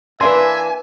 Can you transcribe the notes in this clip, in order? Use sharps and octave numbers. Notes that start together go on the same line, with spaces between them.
E3 A#3 D4 B4 E5 G#5 C6